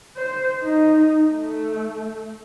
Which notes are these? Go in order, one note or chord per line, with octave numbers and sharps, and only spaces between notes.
C5
D#4
A3